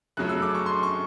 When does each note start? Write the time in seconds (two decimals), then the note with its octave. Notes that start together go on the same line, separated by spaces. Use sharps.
0.17 F#2 C#3 F#3 A3 F#6
0.29 E6
0.42 D6
0.55 C#6
0.66 C6
0.83 C#6